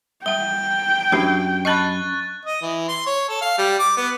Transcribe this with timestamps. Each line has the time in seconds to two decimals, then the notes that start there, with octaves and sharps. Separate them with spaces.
0.26 G3 F#5 G5 G7
1.12 F#2 D4 G4 A#4
1.65 D#5 A5 B5 C#6 F#6 A6
2.45 D#5
2.62 E3
2.88 C6
3.06 C#5
3.29 A4
3.41 F5
3.58 G3
3.79 D6
3.97 B3